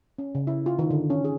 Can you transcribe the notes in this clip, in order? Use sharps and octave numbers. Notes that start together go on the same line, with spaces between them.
C#4
C#3
E4
F4
D#3
D3
C#4
G#4